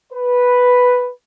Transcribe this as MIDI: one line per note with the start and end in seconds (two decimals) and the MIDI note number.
0.13 1.08 71